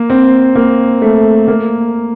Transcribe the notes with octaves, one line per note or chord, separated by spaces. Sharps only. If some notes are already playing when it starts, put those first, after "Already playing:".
Already playing: A#3
C4
A#3
A3
A#3